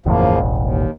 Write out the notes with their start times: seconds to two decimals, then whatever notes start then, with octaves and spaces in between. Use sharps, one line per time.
0.06 F#1 E2 A2 C#3 F3 A#3
0.35 E1 A1
0.57 D#2